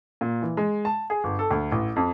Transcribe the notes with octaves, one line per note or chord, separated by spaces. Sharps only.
A#2
E3
G#3
A5
G#4
G1
A4
D2
A1
F2